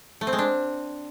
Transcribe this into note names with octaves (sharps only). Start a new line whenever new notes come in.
A3
C4
G#3
D4